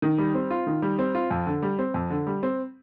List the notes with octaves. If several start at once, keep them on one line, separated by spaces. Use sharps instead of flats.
D#3
G3
C4
F4
D#3
G3
C4
F4
F2
D3
G3
C4
F2
D3
G3
C4